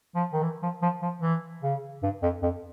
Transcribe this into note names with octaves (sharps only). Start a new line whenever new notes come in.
F3
D#3
E3
F3
F3
F3
E3
C#3
G2
F2
F2